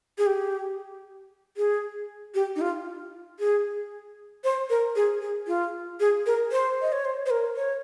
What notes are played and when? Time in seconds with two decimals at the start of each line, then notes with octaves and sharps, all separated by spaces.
0.18 G#4
0.26 G4
1.57 G#4
2.35 G4
2.56 D#4
2.61 F4
3.40 G#4
4.44 C5
4.70 A#4
4.96 G#4
5.21 G#4
5.48 F4
6.00 G#4
6.26 A#4
6.52 C5
6.82 D#5
6.93 C#5
7.05 C5
7.26 C5
7.30 A#4
7.56 C#5